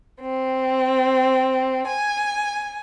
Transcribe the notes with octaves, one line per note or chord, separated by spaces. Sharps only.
C4
G#5